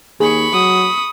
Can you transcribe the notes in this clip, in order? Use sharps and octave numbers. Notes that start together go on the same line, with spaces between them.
D#2 G#4 B5 C#6
F#3 D#6